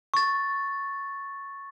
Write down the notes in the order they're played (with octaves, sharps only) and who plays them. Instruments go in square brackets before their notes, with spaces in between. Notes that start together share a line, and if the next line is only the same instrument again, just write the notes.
[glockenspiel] C#6 A6